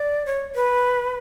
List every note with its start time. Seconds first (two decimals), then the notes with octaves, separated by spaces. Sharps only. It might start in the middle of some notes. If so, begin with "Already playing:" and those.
Already playing: D5
0.26 C#5
0.55 B4